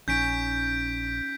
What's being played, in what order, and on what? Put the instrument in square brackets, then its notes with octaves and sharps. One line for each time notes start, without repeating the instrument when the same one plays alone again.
[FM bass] A#1 [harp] C#4 D#4 [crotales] G6 B6 D7